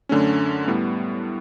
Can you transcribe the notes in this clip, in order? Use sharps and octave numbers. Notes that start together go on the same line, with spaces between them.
F#2 D3 A3 C#4
A2 G3 B3